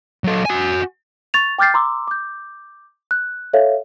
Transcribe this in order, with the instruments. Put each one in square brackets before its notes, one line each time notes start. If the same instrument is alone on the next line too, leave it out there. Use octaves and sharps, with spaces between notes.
[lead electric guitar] F#3 A4
F#4 G#5
[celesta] C#6 A6 F7
G5 D6 F6 G6 A6 C7
A#5 C6 D6 E6
D6 G6
F#6
A4 C#5 E5 F5